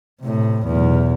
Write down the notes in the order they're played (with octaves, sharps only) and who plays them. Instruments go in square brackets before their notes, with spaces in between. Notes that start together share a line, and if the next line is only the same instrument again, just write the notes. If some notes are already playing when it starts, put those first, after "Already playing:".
[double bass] A2 C3
B1 E2